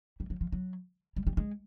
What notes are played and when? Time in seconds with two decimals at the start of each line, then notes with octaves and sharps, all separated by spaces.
0.20 G3
0.30 F#3
0.41 F3
0.52 F#3
1.16 G3
1.27 G3
1.37 G#3